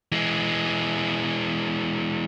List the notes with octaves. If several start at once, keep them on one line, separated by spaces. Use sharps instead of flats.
E3 G#3